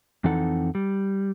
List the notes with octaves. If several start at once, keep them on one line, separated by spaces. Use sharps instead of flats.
F2 E3 C4 D#4 A4 F#5
G3